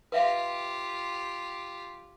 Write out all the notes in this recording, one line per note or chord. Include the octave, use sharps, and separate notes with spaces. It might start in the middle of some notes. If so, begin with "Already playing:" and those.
F4 G4 B4 E5 F5